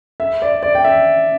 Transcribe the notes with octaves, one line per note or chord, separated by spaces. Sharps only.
E5
D5
D5
G5
E5